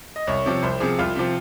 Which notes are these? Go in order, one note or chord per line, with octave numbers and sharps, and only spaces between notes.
D#5
C2 C#5
C3 F3
C2 C5
C3 F3 G#4
C2 F4
C3 F3